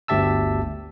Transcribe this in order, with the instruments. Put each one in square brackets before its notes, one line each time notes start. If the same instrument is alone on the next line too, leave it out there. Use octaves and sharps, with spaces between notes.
[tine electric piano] G1 D2 G4 E5 A5 E6